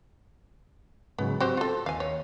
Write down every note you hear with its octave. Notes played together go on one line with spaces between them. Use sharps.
G#2 C#3 F#3 B3
C4 F#4 G4 C5
F4 A4
D#2 F5 G#5
C#5